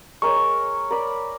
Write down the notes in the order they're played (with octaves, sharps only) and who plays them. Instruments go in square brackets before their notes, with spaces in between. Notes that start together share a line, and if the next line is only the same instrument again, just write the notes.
[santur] G#3 A#4 C#5 [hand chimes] C#6
[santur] C#5
A#4 D5 B5